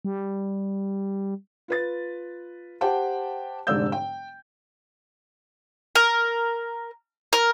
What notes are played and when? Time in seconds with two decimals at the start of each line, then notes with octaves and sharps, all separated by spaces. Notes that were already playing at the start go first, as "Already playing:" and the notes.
0.05 G3
1.68 F4 B4 A6
2.81 G4 C5 F#5 G5 A5
3.67 F1 G#2 D3 D5 E6 G6
3.92 G5
5.95 A#4
7.33 A#4